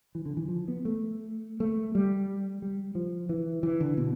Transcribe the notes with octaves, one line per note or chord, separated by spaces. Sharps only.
E3
D3
E3
F3
B3
A3
A3
G3
G3
F3
E3
E3
D3
B2